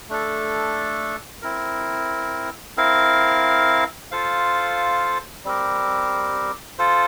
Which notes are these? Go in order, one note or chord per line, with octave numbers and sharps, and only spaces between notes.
A3 D4 A4
C4 E4 A#4
C4 E4 A#4 F5
F4 A4 C5 F5
G3 C4 G4 A#4
F4 A4 C5